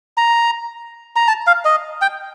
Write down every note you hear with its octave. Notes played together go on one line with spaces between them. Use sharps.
A#5
A#5
A5
F5
D#5
G5